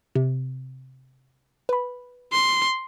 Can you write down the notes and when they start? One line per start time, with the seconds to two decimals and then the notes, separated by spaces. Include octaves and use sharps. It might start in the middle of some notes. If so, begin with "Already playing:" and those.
0.15 C3
1.69 B4 B5
2.33 C6